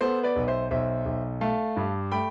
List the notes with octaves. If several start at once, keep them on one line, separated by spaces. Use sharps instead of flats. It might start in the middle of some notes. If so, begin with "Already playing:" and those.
B3 A4 C5
B4 D5
B1
C5 E5
B1 C5 E5
B1
A3 F5 A5
G2
A3 G5 B5